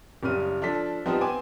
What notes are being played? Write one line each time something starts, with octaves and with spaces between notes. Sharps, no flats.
F#1 C#3 G3 F6 D#7
F3 D4 A4 B6
F3 G3 B3 C4 D#4
B3 C4 G#5 D6